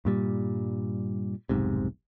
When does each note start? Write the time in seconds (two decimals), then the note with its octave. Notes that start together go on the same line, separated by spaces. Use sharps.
0.05 G2 A#2 G3
1.49 F1 B1 G#2 C3